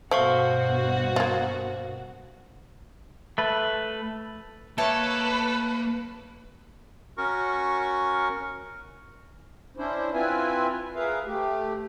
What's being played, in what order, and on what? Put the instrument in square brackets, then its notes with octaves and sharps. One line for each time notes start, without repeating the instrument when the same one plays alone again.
[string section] G2 B2 F#4 [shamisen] A3 [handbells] C5 F5 C#6
[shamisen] A#3 F4
[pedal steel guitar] A3 B4
[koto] A3 C#5 A5 [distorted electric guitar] A#3 [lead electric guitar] A4 [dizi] B4
[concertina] C#4 F#4 A#4 C#6
[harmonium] C#4 D4 E4 C5
C4 E4 F4 B4 E5 G#5
G#4 A#4 B4 E5 F5
A3 G4